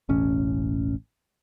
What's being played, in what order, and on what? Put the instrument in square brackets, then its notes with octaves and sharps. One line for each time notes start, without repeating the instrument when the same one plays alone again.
[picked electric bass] E1 A1 C#4